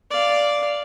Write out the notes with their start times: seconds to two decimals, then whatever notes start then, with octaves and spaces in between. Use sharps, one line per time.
0.11 D5 F5